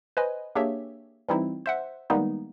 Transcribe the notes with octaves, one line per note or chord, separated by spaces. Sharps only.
B4 C5 D#5 G#5
A#3 D4 G4 G#4 C#5 E5
E3 G3 C4 D#4 E4
C5 E5 F#5
D#3 G3 G#3 A#3 B3 D#4